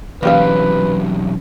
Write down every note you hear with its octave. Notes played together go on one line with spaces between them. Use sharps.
B1 C3 E3 A#3 C#4 G4 B4 F5